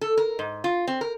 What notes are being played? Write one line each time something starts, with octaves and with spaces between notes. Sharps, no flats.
A4
A#4
G#2
F4
C4
A#4